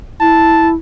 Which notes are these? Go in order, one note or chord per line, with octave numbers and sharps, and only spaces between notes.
E4 A5